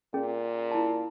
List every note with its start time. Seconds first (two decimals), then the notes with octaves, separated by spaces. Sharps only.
0.14 A#2 C#4 G#4
0.71 E4 A5